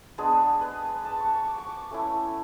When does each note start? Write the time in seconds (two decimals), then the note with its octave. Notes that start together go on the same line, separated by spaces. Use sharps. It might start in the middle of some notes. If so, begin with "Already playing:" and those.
0.18 G#3 B3 D4 G#4
0.61 B4
1.05 A5
1.19 C#6
1.33 C#6
1.48 D6
1.58 C#6
1.69 D6
1.91 A3 C#4 E4